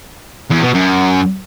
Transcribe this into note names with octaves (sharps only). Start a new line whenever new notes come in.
E2
B2
F#2